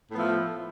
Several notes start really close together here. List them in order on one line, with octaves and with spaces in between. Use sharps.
A2 B3 F3 A3